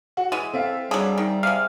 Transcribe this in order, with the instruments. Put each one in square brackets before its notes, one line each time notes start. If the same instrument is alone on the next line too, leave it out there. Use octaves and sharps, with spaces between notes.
[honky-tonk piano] F#4 F#5
[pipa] E3 G#3 [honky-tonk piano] D#7
[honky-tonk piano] C4 E5 F5 [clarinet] A4
[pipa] D3 F#3 [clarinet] G3 [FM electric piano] G#4
[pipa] D#3
[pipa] C3 G#3 [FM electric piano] F5